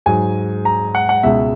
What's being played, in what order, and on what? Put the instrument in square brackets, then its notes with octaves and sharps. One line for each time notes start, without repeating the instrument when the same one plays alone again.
[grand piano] G#2 F#3 G#5
A#5
F#5
F#5
C#2 B2 G#3 E5